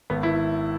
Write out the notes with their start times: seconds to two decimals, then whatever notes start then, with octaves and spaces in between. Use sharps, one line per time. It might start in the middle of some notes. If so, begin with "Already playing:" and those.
0.10 G#1 B3
0.23 E4